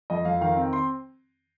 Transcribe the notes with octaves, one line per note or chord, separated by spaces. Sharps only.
F2 D#5
F2 F5
D#3 F5
C4
C6